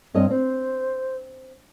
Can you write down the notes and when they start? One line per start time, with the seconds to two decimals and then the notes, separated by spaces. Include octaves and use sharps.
0.14 G2 C4 C#5 D#5
0.30 C4 C5